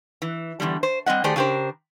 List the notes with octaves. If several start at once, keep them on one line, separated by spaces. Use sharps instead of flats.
E3
E2 G#2 D3 G3
C5
G3 C4 D#5 F#5
D#3 A3 G4 G#4 C5 D5
C#3 D4 G4 A#4 C5